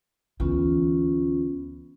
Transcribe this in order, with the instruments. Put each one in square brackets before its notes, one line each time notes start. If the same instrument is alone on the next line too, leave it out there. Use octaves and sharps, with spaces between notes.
[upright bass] D2 E3 [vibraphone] B3 C#4 F4